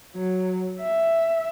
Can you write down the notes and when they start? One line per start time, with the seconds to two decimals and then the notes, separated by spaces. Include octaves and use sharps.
0.15 F#3
0.81 E5